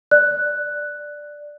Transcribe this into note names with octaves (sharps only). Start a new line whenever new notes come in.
D5 F#6